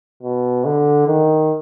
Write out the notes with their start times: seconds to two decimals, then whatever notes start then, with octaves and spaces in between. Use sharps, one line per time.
0.23 B2
0.65 D3
1.07 D#3